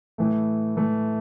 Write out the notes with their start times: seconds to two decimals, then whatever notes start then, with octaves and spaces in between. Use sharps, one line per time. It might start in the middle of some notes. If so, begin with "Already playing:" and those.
0.18 A2 E3 A3
0.76 A2 E3 A3